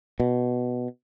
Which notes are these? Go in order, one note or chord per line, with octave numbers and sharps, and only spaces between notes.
B2